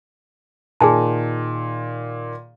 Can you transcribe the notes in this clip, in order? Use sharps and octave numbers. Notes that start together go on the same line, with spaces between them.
A#2 D#3 G#4 G#5 A5